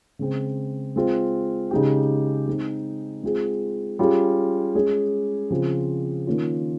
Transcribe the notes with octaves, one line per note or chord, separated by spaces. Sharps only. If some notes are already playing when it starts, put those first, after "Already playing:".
C#3 G#3 C4
G#3 C4 F4
C#3 G#3 D#4 G4
G#3 C4 D#4
G#3 C4 F4 G#4
G3 C#4 F4 G#4
G#3 C#4 G#4
C#3 F3 C4 F4 G#4
D#3 A#3 C#4 F4